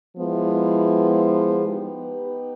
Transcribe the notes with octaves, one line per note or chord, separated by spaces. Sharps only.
F3 G#3 B3 E4
B3 D#4 G4 B4